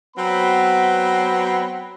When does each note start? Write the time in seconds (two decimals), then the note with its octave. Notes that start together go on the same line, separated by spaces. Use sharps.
0.16 F#3 B3 C4 B5